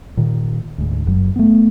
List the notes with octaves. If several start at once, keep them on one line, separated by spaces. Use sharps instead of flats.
A#2 D#3
D2 G#2
F#1 F#2 F#3
A3 B3